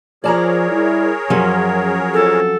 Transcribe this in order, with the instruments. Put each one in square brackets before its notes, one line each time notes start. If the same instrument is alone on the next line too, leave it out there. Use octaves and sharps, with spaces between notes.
[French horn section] F3 [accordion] G#4 A#4 C#5 [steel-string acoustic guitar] D5 A5 A#5
[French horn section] G3 E4
[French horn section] F#2 [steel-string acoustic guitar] F3 F#3 C#4
[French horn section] F2 C4 F4 [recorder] A4